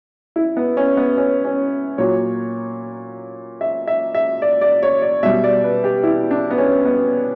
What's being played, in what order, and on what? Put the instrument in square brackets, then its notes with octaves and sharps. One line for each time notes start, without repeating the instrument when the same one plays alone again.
[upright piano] E4
B3
C#4
B3
C#4
C#4
A#2 F#3 C#5
E5
E5
E5
D5
D5
C#5
D5
B2 G3 E5
D5
B4
G4
E4
D4
B3
C#4
B3